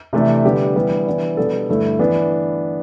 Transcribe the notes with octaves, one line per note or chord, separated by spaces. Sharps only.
C3 E3 A3 D4 A4
D3 G3 B3 D4 G4
E3 G3 B3
E3 B3 D4
B2 G3 B3 D4 A4
G2 D3 A3 E4
E3 B3 D4